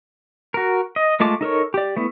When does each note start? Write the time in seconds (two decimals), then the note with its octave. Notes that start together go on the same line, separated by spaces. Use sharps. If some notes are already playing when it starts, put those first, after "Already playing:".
0.54 F#4 A#4
0.96 D#5
1.20 G#3 A3 F4 A5 D6
1.41 D#4 A4 A#4 C#5
1.74 G4 D5
1.97 A3 B3 E4